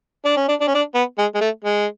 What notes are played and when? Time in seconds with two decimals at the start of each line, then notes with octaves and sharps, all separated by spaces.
0.25 D4
0.37 C#4
0.49 D4
0.61 D4
0.68 C#4
0.75 D4
0.95 B3
1.18 G#3
1.35 G#3
1.41 A3
1.65 G#3